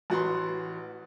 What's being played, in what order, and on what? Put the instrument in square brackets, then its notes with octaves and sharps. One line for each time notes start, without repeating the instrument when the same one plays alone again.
[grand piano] A1 F#4 B4 C6